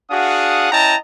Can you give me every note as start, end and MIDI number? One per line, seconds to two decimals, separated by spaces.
0.11 0.71 62
0.11 0.71 66
0.11 0.71 68
0.11 0.71 77
0.11 0.71 78
0.11 0.71 87
0.72 0.96 61
0.72 0.96 64
0.72 0.96 75
0.72 0.96 79
0.72 0.96 81
0.72 0.96 82